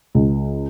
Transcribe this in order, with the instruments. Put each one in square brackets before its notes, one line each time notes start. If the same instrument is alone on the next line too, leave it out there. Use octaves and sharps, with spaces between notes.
[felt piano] C#2